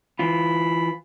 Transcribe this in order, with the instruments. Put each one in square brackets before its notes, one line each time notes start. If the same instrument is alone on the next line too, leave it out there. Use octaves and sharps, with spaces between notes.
[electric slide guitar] E3 F4 [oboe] B5